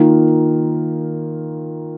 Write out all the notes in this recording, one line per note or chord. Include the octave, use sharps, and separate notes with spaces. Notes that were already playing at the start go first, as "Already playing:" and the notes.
Already playing: D#3 A#3 F4